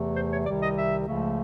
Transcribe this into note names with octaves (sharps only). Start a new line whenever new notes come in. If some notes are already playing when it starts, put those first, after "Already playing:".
Already playing: E2 C3 E3 A3
C5
C#5
C2 C3 D#3 G3 D5
D#5
E5
C#2 C#3 F3 A3